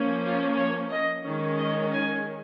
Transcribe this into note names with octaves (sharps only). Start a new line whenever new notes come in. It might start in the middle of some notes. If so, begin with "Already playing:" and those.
Already playing: F3 A#3 C#4
F4
C#5
D#5
D#3 G#3 C#4
D#5
G#5